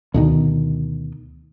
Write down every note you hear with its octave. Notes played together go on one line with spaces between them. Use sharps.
D2 B2 D#3